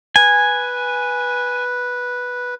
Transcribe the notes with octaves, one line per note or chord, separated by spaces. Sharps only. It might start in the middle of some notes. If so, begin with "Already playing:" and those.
B4 G#5